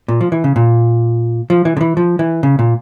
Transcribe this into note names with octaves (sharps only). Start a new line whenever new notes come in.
A#2
F3
E3
C#3
A#2
F3
E3
D3
E3
F3
E3
C#3
A#2